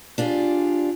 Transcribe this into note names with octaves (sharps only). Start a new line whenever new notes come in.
D4 F4 G4 G#4